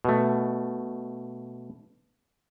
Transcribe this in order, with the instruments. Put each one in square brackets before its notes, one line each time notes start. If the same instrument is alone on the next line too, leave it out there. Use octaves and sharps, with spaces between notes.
[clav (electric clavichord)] B2 A3